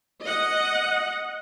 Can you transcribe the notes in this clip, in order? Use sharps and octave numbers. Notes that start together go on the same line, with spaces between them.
D#5 F#5